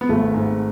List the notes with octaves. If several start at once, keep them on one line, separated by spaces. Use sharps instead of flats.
B3
G#1 A3
G#2